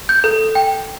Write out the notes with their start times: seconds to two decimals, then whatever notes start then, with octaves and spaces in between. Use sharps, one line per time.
0.09 G6
0.24 A4
0.55 G5